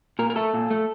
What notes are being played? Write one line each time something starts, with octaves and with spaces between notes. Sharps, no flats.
A#2 A#4
A#4
A3 A4
A#2
A3